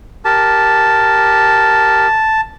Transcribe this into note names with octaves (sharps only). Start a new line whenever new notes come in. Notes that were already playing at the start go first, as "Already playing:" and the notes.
G4 A#4 A5